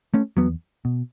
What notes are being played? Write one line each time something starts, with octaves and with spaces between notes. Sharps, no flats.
A3 C#4
E2 F#3 B3
B2